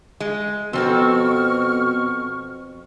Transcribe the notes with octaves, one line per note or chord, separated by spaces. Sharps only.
G#3
F2 B2 C4 A4 C#6 F6